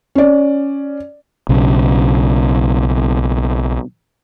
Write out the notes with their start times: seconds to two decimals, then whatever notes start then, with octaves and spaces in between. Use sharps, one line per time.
0.15 C#4 D5
1.49 B1 C#3